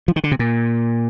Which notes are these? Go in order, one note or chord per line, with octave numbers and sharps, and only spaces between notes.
F3
D#3
D3
C3
A#2